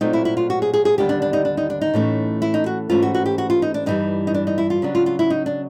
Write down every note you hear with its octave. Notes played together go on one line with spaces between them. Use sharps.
A#2 F#3 A3 C4 D#4
E4
E4
F4
F#4
G#4
G#4
G#4
D#2 D3 G3 B3 D4 G4
D4
D4
D#4
D4
D#4
D4
D#4
A2 E3 A3 C#4
E4
D#4
F#4
G#2 E3 A3 C#4 F4
F#4
F#4
G4
F#4
F4
D#4
D4
G2 E3 G3 D#4
D#4
D4
D#4
E4
F4
C#3 F#3 B3 D4
F4
F4
E4
D#4
D4